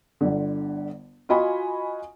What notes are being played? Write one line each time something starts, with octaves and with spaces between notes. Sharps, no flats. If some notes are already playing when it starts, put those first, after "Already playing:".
G1 D3
F4 F#4 D#5 G#5 B5 C#6